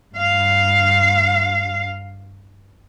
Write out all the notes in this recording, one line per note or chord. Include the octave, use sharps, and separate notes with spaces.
G2 F5